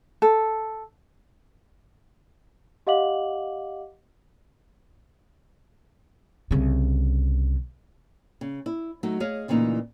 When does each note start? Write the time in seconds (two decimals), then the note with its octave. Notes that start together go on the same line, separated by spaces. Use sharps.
0.22 A4
2.87 G4 D#5 F5 F#5 D6 F#7
6.51 C2 C#3
8.41 C#3
8.66 E4
9.03 F#3 A3 D#4
9.20 G#4 C#5 D#5 F5
9.48 D2 A#2 C#3 E3 D#4